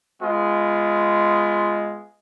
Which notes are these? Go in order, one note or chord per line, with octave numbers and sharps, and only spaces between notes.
G#3 B3 F4